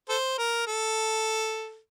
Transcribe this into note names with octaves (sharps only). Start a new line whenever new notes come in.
A4 C5
A#4
A4